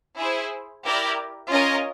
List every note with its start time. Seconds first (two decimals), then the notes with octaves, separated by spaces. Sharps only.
0.18 E4 G#4 C5
0.84 E4 G4 A#4 D5
1.49 C#4 F4 A#4 D#5 G#5